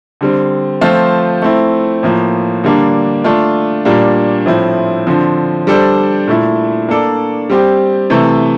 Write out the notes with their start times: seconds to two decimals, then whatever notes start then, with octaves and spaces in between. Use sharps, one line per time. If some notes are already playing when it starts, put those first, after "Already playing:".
0.21 D3 G3 C4
0.81 F3 A3 C4 F4 C5
1.42 A3 C4 E4
2.03 A2 F3 A#3
2.64 D3 G3 A#3 D4
3.24 A3 D4 F4
3.85 A#2 G3 A#3 D4
4.46 A2 F3 C4 E4
5.07 D3 F3 C4
5.67 G3 D4 A4 C5
6.27 A#2 A3 E4
6.89 A#3 D4 A4 D5
7.50 G3 C4 G4
8.10 C3 E3 A3